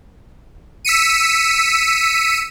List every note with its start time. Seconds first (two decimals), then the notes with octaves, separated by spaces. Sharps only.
0.85 E6 B6 C#7 D#7